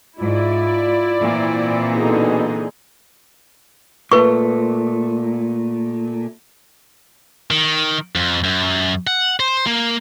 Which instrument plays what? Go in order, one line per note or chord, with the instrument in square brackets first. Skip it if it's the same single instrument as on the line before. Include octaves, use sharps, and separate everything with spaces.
[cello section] G#2 [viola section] E4 D5 [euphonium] F4
[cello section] A#2 E3 C4
[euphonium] B2 [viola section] D3 D#4 G#4
[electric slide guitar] A#2 A3 [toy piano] B4 C#6
[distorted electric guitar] D#3
F2
F#2
F#5
C5
A#3